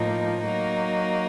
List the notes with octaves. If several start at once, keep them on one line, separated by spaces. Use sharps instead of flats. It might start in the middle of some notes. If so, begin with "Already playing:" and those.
Already playing: A2 F3 A#3 D#4
F#3 A#3 D#4